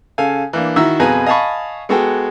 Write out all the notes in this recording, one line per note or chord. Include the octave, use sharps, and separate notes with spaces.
C#3 A4 F5 G#5
E3 A#3 D4
D#3 E4 F#4 A#5 E6
F2 B2 G#4 B4 G#5 A#5
D#5 F5 G#5 A5 B5 C#6
G#3 B3 F#4 G#4 A4 G5